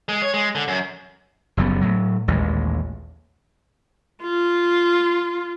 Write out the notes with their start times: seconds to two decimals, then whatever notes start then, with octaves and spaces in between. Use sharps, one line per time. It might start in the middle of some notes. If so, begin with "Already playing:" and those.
0.09 G#3
0.22 C#5
0.34 G#3
0.55 D3
0.68 F#2
1.57 F#1 F#2 G3 B3
1.81 A2 F#3
2.28 A1 D#2 A#2 G#3
4.22 F4